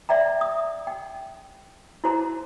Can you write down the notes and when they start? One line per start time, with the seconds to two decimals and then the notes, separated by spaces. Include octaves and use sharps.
0.09 D5 E5 G5 A#5
0.41 D#6
0.87 G5
2.04 E4 F#4 C5 A5 A#5